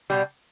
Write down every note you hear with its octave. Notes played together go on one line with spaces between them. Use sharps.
B2 G3